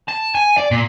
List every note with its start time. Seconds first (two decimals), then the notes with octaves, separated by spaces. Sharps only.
0.09 A5
0.35 G#5
0.58 D5
0.71 A#2